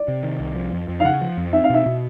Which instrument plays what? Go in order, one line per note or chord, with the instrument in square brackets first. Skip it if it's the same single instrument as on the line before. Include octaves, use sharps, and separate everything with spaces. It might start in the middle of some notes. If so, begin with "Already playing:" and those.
Already playing: [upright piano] D5
[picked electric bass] C3
D#3
C2
F3
F2
F2
[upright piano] F5
[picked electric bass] C#3 [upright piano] F#5
[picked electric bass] F3
F2
[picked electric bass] C4 [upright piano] E5
[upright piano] F5
[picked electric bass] B2 [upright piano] E5
[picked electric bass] B2